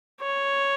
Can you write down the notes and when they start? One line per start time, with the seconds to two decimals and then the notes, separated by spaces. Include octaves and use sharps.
0.21 C#5